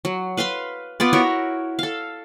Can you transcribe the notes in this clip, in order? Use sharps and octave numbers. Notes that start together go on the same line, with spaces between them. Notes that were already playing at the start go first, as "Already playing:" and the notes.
F#3
B4 F5 B5 C6
B3 F4 D5
E4 F#4 A#4 C#5
A4 F5